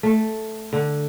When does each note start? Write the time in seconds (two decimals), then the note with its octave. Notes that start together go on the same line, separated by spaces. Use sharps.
0.03 A3
0.73 D3